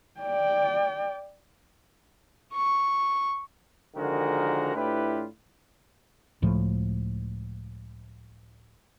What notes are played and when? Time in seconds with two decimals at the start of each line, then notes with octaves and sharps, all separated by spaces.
0.20 D5 G5
2.53 C#6
3.96 D3 D#3 F3 G#3 F#4 A#4
4.76 A2 D4 E4 F4 G4 B4
6.42 C#2 A2 F3